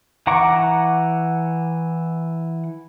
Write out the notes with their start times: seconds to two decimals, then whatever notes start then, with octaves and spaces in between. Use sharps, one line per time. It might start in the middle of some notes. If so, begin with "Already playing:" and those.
0.27 E3 F#5 A#5 C#6 D6